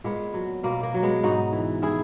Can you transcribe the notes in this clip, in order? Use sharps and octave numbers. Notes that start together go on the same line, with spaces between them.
A#2 G#3 B3
F#3
B2 A#3
A#3
F#3
G#3 B3
G#2 D#4 F#4
E3
D#3 E4 G#4